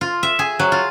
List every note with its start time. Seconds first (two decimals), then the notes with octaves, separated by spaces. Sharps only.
0.01 F4
0.23 E5
0.39 G#4
0.59 F#3
0.72 F4